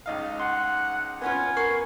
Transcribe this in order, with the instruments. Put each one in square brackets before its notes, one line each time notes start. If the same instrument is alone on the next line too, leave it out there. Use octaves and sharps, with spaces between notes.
[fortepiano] C#2 D#4 F5
[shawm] F#5 [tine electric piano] C6
[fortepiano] B3 C#4 F4 [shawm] G#5
[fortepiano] B3 [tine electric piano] A#4 C#6 C7